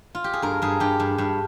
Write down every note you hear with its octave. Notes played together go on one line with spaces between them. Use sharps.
F4
G4
G#4
G2 A#4
G2 G#4
G2 G4
G2
G2